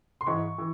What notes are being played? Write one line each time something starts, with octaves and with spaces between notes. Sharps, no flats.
C6
G#2 E3 G#3 C#6
E3